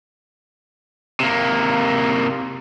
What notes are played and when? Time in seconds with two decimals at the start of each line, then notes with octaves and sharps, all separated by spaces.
1.20 C3 A#3